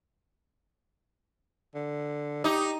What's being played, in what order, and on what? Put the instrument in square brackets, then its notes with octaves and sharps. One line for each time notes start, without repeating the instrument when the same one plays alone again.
[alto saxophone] D3
[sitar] D#4 [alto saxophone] G4